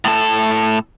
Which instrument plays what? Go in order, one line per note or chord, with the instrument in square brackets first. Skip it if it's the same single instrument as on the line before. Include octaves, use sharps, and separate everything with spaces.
[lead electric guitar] A2 A4